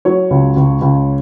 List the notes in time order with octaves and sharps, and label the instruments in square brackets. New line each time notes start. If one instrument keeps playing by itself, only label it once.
[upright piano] F#3 C#5
C#2
C#2
C#2